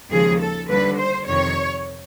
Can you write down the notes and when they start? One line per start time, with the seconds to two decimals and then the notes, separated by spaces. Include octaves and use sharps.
0.11 D#2 C#3 F3 G#3 G#4
0.40 A4
0.69 D#2 D3 G3 B4
0.98 C5
1.27 F2 C3 D#3 C#5